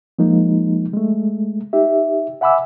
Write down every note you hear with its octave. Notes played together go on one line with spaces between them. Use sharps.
F3 G#3 A#3 D#4
G#3 A3
D#4 G4 E5
E5 F#5 G#5 B5 D6 E6